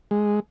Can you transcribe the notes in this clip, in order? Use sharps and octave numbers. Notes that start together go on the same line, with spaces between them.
G#3